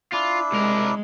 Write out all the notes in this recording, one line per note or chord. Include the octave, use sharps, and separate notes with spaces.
D4 E4 F4
C2 G#3 A#4